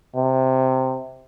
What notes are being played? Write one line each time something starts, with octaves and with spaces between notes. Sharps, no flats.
C3